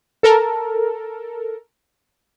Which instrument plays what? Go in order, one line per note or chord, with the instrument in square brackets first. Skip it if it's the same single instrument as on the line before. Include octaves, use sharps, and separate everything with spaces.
[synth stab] A4 A#4